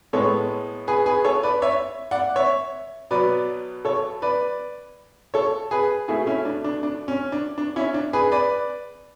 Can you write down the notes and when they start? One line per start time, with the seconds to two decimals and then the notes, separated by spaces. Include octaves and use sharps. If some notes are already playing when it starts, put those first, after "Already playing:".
0.13 A2 G#3 B3 A4 C#5
0.87 G#4 B4
1.06 G#4 B4
1.25 A4 C#5
1.43 B4 D5
1.62 C#5 E5
2.11 D5 F#5
2.36 C#5 E5
3.10 B2 F#3 B3 B4 D5
3.85 A4 C#5
4.22 B4 D5
5.34 A4 C#5
5.71 G#4 B4
6.08 B2 A3 E4 G#4
6.27 C#4 E4
6.45 D4
6.64 D4
6.83 D4
7.08 C#4
7.32 D4
7.58 D4
7.76 C#4 E4
7.94 D4
8.13 G#4 B4
8.32 B4 D5